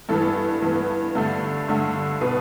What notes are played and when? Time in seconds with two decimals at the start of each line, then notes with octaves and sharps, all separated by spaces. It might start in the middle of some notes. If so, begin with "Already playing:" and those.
0.09 G2 E3 B3 A4
0.62 G2 E3 B3
1.15 G2 D3 A3
1.68 G2 D3 A3
2.21 B2 B3 B4